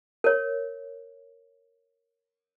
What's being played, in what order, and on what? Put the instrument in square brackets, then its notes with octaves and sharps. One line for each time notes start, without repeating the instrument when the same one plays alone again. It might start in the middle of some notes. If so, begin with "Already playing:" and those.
[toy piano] A#4 C#5